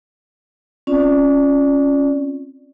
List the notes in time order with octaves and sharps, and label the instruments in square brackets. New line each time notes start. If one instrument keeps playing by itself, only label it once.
[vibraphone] C4 C#4 F4 D5